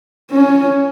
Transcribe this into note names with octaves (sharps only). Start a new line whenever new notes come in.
C#4